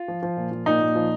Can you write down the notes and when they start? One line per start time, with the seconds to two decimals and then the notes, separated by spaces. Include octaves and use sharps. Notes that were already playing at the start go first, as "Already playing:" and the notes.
Already playing: F4
0.08 F3
0.23 F3
0.37 A#2
0.51 F3
0.66 A#2 D#4
0.81 A#2
0.96 F3